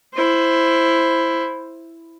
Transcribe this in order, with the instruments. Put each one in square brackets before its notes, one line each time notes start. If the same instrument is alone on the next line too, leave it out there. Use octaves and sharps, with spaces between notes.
[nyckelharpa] E4 C5